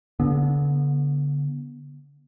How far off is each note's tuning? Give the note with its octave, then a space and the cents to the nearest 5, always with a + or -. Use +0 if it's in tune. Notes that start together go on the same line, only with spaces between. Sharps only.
D3 -35 B3 -30